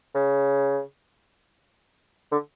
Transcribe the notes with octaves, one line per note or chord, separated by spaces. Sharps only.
C#3
D3